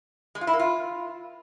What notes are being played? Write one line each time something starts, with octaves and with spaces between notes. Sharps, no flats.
G#3
F4
E4
A#3
F4